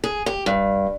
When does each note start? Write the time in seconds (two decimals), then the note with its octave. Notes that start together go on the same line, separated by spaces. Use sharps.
0.04 G#4
0.26 G4
0.46 G2